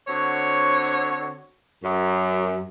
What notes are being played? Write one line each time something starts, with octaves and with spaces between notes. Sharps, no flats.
D3 C4 F#4 C#5
F#2